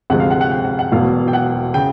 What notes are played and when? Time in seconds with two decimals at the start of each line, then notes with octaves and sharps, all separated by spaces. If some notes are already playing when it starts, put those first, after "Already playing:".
0.10 D2 C3 F3 G#3 F#5
0.20 F5
0.30 F#5
0.41 F#5
0.51 G5
0.65 F#5
0.79 F#5
0.92 E1 E2 B2 F#3 F5
1.28 G5
1.33 F#5
1.74 C#3 G5